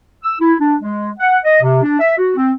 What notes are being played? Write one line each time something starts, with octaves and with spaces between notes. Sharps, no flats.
E6
E4
D4
G#3
F#5
D#5
C3
D4
E5
F#4
C4